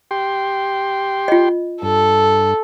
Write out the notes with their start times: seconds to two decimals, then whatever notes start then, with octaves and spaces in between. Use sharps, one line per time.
0.11 G4 G5 C6
1.28 F4 D#5
1.82 G2 A4